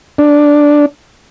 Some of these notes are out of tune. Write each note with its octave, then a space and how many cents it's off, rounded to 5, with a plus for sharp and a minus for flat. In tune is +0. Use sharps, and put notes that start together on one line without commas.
D4 +0